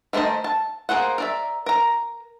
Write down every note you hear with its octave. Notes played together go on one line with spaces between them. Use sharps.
D#3 A3 A#4 C5 D#5
A5
A#3 G#4 C5 F#5
A#4 D5 E5
A#4 A#5